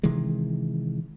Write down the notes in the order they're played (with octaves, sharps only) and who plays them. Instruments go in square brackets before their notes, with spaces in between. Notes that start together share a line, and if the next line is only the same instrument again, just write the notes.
[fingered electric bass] C3 D#3 E3 G#3